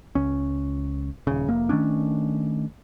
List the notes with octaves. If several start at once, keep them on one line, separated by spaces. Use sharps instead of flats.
C#2 C#4
D#1 C#3
F1 A#3
D#3 A3 C#4 D4